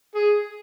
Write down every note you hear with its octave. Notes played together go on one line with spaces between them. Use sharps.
G#4